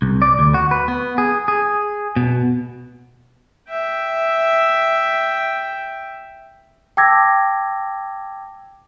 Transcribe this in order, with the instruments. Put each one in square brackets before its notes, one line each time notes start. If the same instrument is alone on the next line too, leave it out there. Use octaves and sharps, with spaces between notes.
[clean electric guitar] C2
D5
D2
F#4
B4
B3
G#4
G#4
B2
[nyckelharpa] E5 G5
[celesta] G5 A5 D6 E6 G#6 A#6